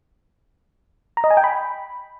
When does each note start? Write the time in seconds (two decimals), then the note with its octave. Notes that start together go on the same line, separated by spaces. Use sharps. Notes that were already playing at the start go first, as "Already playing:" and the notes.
1.17 A#5
1.24 D#5
1.30 G#5
1.37 G5
1.44 B5